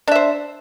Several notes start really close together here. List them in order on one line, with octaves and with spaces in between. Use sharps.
D4 E5 C5